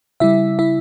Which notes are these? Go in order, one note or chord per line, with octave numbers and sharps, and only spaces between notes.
C#3 G3 E4 E5
E4 E5